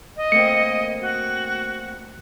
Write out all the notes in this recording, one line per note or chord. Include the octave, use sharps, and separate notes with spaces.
D#5
A3 A#3 C4 C#7
F#4